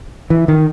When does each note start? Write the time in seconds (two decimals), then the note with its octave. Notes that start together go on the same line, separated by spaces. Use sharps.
0.30 E3
0.48 D#3